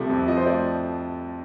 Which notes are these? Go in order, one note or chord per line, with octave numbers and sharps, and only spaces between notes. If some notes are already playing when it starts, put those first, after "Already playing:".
Already playing: C2 C3 F3 A3
F2
F3 D#5
C5
A3 D5